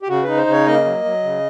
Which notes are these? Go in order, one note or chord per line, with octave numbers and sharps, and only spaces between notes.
G4
C#3 F#4
D#4 B4
C5
C#3 C#5
A#3 D#5
F#3
F#3
C#3